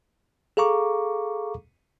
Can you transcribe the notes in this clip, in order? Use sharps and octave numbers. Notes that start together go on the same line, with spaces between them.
G#4 A4 F5 A#5 C#6 D6